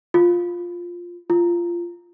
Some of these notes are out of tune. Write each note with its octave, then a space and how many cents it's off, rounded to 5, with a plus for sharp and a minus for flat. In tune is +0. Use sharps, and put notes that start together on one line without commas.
F4 +5
F4 -15